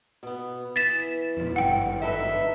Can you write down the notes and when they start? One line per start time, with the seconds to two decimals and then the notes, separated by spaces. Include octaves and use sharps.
0.23 B2 B3
0.76 E3 A6 B6 E7
1.37 F2 B2
1.56 G#1 G2 F#5 G5
2.02 D#4 A4 B4 E5